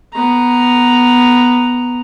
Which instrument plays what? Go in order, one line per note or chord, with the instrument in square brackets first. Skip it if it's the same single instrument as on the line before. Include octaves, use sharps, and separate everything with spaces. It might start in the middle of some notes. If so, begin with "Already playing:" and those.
[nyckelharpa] B3 A#5